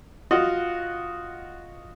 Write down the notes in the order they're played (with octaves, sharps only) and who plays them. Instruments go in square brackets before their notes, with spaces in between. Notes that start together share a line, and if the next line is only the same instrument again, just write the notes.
[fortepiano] F4 F#4 D#5 F#5